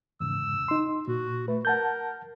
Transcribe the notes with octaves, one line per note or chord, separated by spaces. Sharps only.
E2 G#2 C#3 E6
D#4 C6
A#2 F#4
A3 B4
A#4 F#5 A5 G6